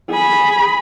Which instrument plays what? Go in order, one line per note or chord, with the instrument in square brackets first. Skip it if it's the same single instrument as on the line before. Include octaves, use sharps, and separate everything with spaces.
[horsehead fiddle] G#4 B5